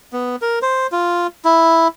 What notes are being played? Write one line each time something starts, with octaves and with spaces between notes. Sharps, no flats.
B3
A#4
C5
F4
E4